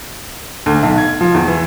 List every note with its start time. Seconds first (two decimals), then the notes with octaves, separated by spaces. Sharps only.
0.66 D2
0.83 B1
0.98 G#6
1.21 F3
1.34 E2
1.48 E3